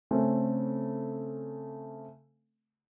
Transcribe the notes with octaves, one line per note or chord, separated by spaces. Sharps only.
C#3 A3 C4 C#4